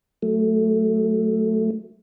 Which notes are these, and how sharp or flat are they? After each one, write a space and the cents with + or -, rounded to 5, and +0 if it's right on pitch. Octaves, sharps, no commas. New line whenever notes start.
F#3 +0 A3 +0